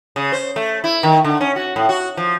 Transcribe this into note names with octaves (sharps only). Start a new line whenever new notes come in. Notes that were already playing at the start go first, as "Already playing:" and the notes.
C#3
C5
A3
E4
D#3
D3
C#4
F#4
A2
F#4
F3